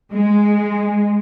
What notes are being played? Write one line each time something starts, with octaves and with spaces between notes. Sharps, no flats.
G#3